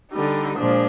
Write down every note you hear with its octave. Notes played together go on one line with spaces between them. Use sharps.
D3 G3 D#4
A#2 F3 G#3 D4